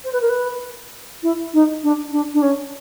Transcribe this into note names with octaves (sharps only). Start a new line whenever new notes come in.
C5
B4
A#4
B4
E4
D#4
D4
D4
D4
C#4